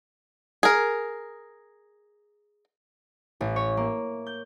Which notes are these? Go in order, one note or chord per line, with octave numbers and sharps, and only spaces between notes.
G#4 A#4
A1
C#5
A#3
G6